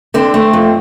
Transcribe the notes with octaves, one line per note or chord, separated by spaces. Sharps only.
D3 C4
A3
F2